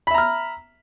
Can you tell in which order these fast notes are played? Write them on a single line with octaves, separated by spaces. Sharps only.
B5 E5 A#5 F6